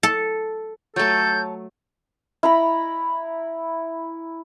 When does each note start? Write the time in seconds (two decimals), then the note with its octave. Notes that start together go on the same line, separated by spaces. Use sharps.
0.03 A4
0.96 F#3 A3 A4 C#5 A5 G6
2.43 E4 A#5 B5